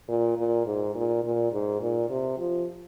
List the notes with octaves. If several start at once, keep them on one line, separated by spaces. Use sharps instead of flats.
A#2
A#2
G#2
A#2
A#2
G#2
A#2
C3
F3